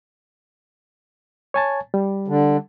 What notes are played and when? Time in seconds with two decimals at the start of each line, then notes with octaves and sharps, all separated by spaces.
1.54 C#5 G#5 A5
1.94 G3
2.28 D3